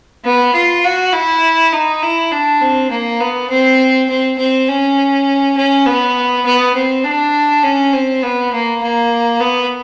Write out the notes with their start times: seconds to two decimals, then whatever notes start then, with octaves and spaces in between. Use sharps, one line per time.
0.25 B3
0.54 F4
0.84 F#4
1.13 E4
1.72 D#4
2.02 E4
2.32 D4
2.61 C4
2.90 A#3
3.21 B3
3.50 C4
4.09 C4
4.38 C4
4.68 C#4
5.57 C#4
5.86 B3
6.45 B3
6.75 C4
7.05 D4
7.63 C#4
7.93 C4
8.23 B3
8.53 A#3
8.82 A#3
9.41 B3